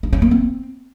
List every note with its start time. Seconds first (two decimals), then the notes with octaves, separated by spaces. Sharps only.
0.03 D4
0.13 C#4
0.22 A#3
0.31 C4